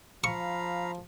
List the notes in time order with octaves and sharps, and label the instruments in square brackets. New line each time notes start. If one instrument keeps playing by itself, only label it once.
[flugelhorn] F3 [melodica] F5 A#5 B5 [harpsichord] C#6